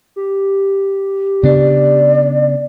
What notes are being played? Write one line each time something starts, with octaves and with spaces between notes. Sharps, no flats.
G4
C#3 B3 D4 D5